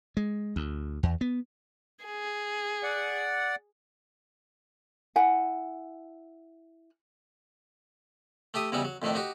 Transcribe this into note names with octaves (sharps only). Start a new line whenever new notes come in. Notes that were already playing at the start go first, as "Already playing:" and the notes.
G#3
D2
E2
B3
G#4
D5 F#5
E4 F#5 G#5
A3 G4 E5 D#6
E2 C#3 E3 F#3 G3 D#4
F#3
F2 A2 D#3 A3 D4
D#4 F#4 G4